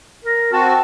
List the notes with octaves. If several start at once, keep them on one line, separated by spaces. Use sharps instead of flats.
A#4
C4 F#4 A5